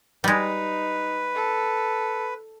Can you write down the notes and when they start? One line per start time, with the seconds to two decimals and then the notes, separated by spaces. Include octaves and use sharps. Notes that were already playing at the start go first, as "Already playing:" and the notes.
0.24 G3 G#3 D#4 B4
1.35 A4